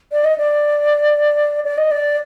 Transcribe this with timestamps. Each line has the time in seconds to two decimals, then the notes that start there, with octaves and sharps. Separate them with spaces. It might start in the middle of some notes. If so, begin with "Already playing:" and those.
0.12 D5
0.24 D#5
0.38 D5
1.64 D5
1.78 D#5
1.91 D5